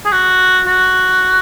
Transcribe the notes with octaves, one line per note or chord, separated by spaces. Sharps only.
G#4
F#4
F#4